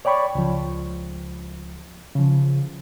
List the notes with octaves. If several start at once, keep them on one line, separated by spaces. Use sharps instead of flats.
C#5 D5 G5 B5 C#6
C#2 F3
C#3 F3